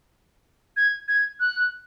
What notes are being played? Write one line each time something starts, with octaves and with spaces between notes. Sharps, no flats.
G#6
G#6
F#6